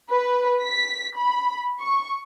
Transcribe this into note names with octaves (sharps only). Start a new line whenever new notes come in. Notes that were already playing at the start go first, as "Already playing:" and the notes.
B4
B6
B5
C#6